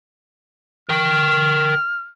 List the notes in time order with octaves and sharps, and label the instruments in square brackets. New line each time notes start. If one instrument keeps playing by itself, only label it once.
[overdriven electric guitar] A#4 G5 [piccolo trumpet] F6